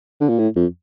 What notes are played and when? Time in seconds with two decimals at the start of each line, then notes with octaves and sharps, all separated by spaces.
0.20 D3
0.29 A#2
0.39 A2
0.56 F2